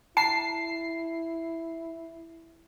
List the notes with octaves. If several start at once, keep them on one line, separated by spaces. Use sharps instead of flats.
E4 A5 C7